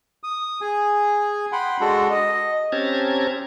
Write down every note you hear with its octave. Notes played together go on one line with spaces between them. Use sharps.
D#6
G#4 G#5
F#5 G5 B5 C6
G#3 D4 F#4 A4
D#5
C4 C#4 G4 A5 A#5 G#6